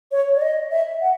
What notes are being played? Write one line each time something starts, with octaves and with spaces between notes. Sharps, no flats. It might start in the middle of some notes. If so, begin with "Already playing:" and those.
C#5
D5
D#5
E5
F#5